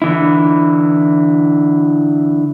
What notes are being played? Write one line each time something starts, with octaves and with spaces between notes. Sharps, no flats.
D3 E3 E4